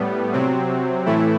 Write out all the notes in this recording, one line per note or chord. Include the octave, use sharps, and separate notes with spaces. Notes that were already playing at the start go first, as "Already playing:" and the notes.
Already playing: A2 G3 B3
C3 F#3 C4
A2 E3 A3 E4